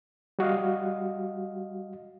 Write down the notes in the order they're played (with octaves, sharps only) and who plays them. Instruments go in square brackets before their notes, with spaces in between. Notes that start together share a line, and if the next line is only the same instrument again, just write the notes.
[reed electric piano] G3 F#4 D#5 F5